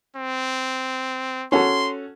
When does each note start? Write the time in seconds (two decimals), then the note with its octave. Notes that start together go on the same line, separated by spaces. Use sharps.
0.16 C4
1.52 C#4 F#4 A4 C6